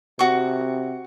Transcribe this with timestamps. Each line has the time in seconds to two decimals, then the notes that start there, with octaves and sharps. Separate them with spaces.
0.19 C3 F#4 C#6